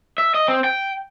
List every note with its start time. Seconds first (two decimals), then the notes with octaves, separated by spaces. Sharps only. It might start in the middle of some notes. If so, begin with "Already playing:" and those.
0.18 E5
0.34 D#5
0.48 C4
0.64 G5